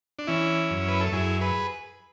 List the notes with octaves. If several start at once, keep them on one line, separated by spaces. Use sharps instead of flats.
D4
E3 C#4 E4
F#2
B4
A4
F#2 E4 G#4
G#4 B4